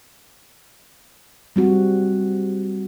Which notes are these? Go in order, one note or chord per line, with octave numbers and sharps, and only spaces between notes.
G3 C4 F#4